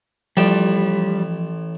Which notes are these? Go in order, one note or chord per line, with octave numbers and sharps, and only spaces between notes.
A1 F3 G3 G5 A5